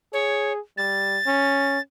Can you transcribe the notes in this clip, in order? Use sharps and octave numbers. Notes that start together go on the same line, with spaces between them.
G#4 C#5
G3 A6
C#4